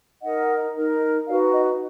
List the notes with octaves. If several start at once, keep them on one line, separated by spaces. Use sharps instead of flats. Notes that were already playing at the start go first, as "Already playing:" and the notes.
D#4 A#4 D#5 F#5
D#4 A#4
D#4 F#4 B4 D5 F5
D#5